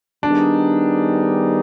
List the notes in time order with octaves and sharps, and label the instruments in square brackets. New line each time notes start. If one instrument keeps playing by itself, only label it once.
[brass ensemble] D#3 G3 B3 D#4 G#4 [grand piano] D4